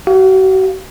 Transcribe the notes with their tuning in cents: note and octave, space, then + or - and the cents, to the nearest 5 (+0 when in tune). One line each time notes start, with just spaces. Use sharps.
F#4 +40 F5 +0